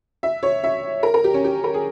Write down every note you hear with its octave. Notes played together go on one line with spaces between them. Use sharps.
E5
C#5
E5
A#4
A#4
G4
C#4
G4
A#4
G#4